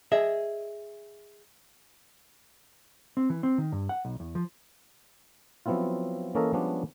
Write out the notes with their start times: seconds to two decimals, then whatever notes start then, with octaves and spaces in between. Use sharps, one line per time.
0.12 G#4 D#5 E5
3.17 C4
3.30 E3
3.43 C4
3.58 D#3
3.72 G2
3.89 F#5
4.05 B1
4.20 E2
4.35 F3
5.66 F3 F#3 B3 C4 E4 F4
6.35 E3 A#3 C#4 A4 A#4 D#5
6.53 F3 G3 G#3 B3 C#4 D4